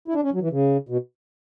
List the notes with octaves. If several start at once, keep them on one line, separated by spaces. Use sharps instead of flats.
E4
D4
C#4
F#3
E3
C#3
B2